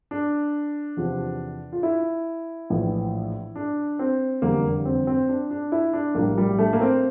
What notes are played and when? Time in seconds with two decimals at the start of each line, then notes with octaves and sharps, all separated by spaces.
0.11 D4
0.97 E2 C3 F3
1.73 F4
1.83 E4
2.70 A#1 A2 E3
3.56 D4
3.99 C4
4.42 F1 E2 D3 G3 A#3
4.85 C4
5.07 C4
5.29 D4
5.50 D4
5.72 E4
5.93 D4
6.15 A#1 A2 G3 A#3
6.38 G3
6.59 A3
6.73 A#3
6.81 C4